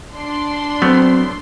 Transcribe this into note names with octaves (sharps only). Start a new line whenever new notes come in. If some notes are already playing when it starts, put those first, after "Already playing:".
D4 C6
F#3 A3 B3 C4